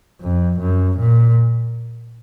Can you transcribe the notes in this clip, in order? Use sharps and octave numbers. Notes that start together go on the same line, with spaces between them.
F2
F#2
A#2